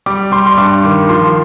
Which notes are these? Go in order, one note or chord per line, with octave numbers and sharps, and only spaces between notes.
G3 D6
G3 C6
C6
G2 D6
D#3
F3 C6